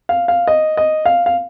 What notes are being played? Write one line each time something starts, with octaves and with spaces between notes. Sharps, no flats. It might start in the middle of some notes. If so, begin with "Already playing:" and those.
F5
F5
D#5
D#5
F5
F5